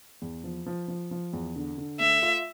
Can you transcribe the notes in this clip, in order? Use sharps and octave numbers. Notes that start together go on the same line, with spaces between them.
E2
F3
F3
F3
F3
E2
D3
D3
A3 E5
F4